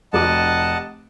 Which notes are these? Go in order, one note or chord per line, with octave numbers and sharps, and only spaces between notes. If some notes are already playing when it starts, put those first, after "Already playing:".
F1 F#4 D#5 F#5 A5 D6